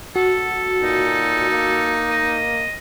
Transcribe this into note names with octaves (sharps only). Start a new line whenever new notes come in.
F#4 A4
A#2 D#4
A#3
D#5